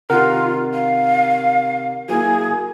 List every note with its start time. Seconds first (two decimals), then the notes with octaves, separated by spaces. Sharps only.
0.10 C3 D#3 F4 A#4 F#5
0.73 F5
2.09 F#3 A#3 E4 G#4